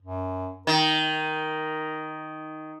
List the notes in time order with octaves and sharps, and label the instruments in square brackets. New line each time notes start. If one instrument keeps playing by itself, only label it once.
[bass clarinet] F#2
[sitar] D#3 [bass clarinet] A#4